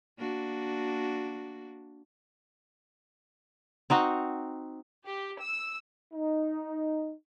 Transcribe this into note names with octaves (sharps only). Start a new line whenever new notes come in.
A#3 D4 F#4
C4 D#4 F#4
G4
E6
D#4